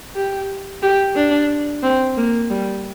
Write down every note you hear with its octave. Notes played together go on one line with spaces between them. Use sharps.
G4
G4
D4
C4
A#3
G3